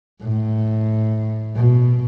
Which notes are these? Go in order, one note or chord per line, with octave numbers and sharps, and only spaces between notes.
A2
B2